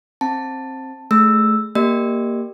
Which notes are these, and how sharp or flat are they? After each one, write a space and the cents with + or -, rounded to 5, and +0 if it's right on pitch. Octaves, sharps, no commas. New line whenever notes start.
C4 +15 A5 +10
A3 -15 G#4 +0 E6 +0
A#3 +0 G4 +0 D5 +35